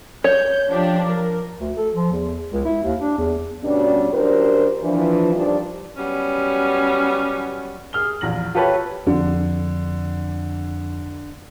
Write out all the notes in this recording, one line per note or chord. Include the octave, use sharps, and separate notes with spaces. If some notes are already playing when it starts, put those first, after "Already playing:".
C#5 G6
F3 D4 G4
A#4
D2
A4
F3
E2
C#2
E4
D#2
D4
E2
D2 G2 B2 G3 C#4 D4
F#2 D4 F4 G4 A#4 C5
E3 F3 D4
D#3 F3 G3 D4
F#3 G3 B3 C#4
G#4 F6 G7
A#1 E2 A#6 F#7
F4 G4 A4 B4 C#5
F2 D3